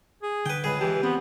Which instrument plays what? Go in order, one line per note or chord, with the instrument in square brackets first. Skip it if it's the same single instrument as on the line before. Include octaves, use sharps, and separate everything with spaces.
[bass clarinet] G#4
[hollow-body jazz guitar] D3 [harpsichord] B4 G5
[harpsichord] C#2 G#4 [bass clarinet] B4
[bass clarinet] E3 [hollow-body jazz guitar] G#3 A5 [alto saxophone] G4
[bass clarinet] B3 [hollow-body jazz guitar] C4